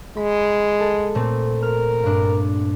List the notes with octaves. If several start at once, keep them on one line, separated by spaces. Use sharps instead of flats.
G#3 B5
A4
A#2 A3 C4
A#4 F6
G2 D4